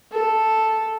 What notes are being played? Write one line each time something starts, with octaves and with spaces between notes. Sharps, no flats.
A4